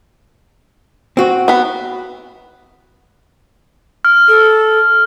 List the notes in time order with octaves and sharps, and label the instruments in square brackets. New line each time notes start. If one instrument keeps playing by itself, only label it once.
[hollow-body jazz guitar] C4 F#4
[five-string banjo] B3 B5
[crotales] F6
[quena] A4